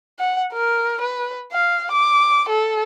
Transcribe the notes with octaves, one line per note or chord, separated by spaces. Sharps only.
F#5
A#4
B4
F5
D6
A4